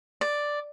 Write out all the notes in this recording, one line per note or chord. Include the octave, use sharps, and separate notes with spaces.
D5